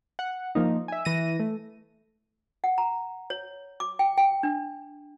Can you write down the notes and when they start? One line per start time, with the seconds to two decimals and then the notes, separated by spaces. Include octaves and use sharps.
0.19 F#5
0.55 F3 A#3 D#4
0.88 E5 G#5
1.05 E3 A#6 D#7
1.40 A3
2.64 F#5
2.78 A#5
3.30 C#5
3.80 D6
3.99 G5
4.17 G5
4.43 D4